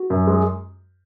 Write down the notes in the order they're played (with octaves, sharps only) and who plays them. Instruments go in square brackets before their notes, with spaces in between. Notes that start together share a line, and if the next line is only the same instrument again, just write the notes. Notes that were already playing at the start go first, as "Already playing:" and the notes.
Already playing: [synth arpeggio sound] F#4
[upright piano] F#2
G#3